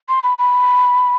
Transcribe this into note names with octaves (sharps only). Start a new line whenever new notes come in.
C6
B5
B5